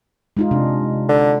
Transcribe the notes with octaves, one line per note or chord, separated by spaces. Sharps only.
G#3 D#4 F4
C3 D4
D3